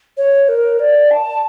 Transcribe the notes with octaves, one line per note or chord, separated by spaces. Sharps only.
C#5
A#4
D5
A5